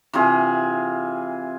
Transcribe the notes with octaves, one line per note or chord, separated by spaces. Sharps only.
C3 E3 F4 G#4